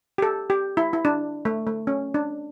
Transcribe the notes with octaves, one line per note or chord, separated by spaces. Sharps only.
G4
A4
G4
E4
E4
D4
A3
A3
C#4
D4